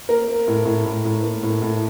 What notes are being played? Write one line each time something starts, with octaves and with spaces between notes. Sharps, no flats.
A#3 A#4
A#3
A2
A2
A2
A2
A#3
A2
A2